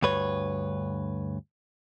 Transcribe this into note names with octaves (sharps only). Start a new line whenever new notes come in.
D2 G2 B4 C#5